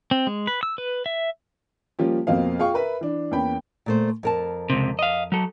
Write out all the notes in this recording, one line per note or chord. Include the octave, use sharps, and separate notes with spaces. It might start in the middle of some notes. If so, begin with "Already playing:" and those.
C4
G#3
B4
E6
B4
E5
F3 G3 A#3 C#4 F4 G4
F2 B2 A#3 C4 D#5 F5
F4 G#4 F5 G5 C#6
A#4 B4 E5 B5
E3 D4
E2 A#3 C#4 G5 B5
A#2 A3 C5
F2 A#4 A5
C#2 C3
D#5 F5
F#3 A4